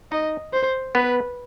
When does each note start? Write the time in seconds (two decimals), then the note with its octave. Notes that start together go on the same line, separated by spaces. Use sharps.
0.12 D#4 D#5
0.53 C5
0.95 B3 B4